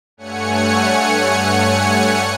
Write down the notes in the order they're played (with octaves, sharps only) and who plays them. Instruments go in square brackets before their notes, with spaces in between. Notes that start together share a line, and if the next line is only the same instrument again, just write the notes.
[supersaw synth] G2 A3 C#5 F#5 G#5 C#7